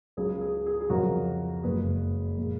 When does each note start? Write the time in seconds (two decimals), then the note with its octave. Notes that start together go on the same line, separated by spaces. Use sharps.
0.17 C#2 C#3 F#3 G#4
0.41 G#4
0.66 G#4
0.81 G#4
0.90 F2 C#3 F#3 F#4 A#4
1.63 F#1 F#2 C#3 G#3 G#4 B4
2.38 A#2 F3 G#3